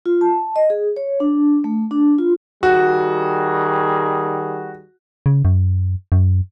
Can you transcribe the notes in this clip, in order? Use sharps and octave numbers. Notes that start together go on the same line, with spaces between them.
F4
A5
D#5
G#4
C#5
D4
A3
D4
F4
D#3 G3 F#4 G#4
C#3
F#2
F#2